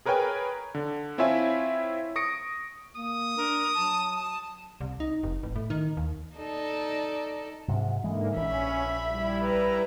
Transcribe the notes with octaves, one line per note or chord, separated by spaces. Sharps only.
G#4 A#4 B4 C#5 G5 G#5
D3
C4 E4 F4 C#5 E5 G#5
C#6 D#6 A#6 C#7 D7
A#3 D#6
D4 A#4
F#3 A5
A5
C2
D#4
F1
A1
A2
D#3
D#2
D#4 A4 D5
G#2 C3 F#3
G#2 D3 E3 G#3 A#3
A#1 C#4 E5 B5
G3 E4
B4 A#5